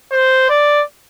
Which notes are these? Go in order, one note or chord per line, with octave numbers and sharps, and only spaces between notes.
C5
D5